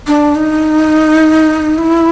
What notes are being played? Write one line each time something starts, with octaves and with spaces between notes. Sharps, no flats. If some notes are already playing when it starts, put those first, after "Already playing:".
D4
D#4
E4